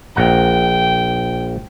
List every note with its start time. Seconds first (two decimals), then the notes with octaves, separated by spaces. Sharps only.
0.16 A#1 F#5 G5 A#5